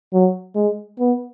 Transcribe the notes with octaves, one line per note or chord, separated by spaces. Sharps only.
F#3
G#3
B3